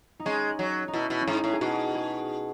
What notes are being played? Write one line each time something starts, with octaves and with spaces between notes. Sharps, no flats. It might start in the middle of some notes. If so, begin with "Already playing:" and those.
D#4
G#3 C#4
F#3
D#4
B2 E4
B2
C#4
G#2 D#4
A2
G#4
B2 F#4
G#4